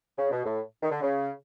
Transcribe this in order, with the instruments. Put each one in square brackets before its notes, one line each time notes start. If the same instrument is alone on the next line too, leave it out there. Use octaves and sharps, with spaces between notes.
[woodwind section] C#3
B2
A2
D#3
D3
C#3